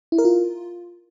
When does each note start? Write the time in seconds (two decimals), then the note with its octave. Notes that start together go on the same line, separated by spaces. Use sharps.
0.12 E4
0.18 A#4
0.25 F4